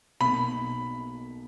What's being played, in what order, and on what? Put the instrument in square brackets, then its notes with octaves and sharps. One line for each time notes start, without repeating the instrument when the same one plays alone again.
[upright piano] B1 B2 A#3 [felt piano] B5